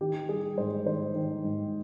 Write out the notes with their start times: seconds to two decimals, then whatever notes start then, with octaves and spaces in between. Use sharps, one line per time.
0.01 D#3 G4
0.29 G3 G#4
0.57 G#2 C5
0.86 D#3 C5
1.14 D#3
1.44 G#2